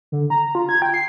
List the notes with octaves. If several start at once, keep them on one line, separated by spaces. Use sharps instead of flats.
D3
A#5
F4
G#6
G5
C7